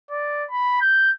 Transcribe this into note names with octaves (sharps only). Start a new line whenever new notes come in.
D5
B5
G6